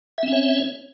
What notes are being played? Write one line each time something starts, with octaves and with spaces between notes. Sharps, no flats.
C4 C#4 C#5 E5